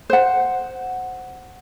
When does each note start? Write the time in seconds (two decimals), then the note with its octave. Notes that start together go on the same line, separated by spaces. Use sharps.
0.10 C5 F#5